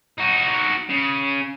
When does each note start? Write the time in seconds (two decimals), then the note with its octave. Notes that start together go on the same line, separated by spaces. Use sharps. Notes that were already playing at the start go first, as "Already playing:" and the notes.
0.18 D#4 F#4
0.89 C#3